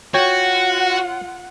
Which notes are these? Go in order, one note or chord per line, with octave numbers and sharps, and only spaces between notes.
F4 F#4 C#5 F#5 G5